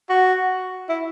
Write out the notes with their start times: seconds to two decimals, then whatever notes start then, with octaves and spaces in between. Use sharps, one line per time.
0.10 F#4
0.89 E4